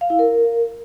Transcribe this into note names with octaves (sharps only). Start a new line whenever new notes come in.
F5
E4
A#4